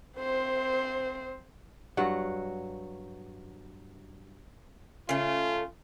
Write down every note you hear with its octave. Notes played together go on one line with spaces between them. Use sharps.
C4 C5
G2 F#3 F#5
C#3 A3 F4